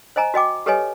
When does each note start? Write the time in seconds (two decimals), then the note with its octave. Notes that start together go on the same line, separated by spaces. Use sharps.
0.16 C5 D#5 G#5 A#5
0.34 F#4 D#5 G5 D6
0.66 G4 A4 B4 C#5 D#5 G#5